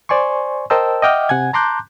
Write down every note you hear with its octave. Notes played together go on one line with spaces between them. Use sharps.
C5 D5 G#5 C6 C#6
A#4 C5 D#5 G5 A5 E6
D#5 E5 F#5 G5 D6 F6
C3 F#5 G#5 G#6
A5 A#5 C6 D6 F#6 G6